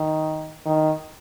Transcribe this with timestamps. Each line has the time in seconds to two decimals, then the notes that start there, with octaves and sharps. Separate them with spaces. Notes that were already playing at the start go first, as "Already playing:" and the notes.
Already playing: D#3
0.66 D#3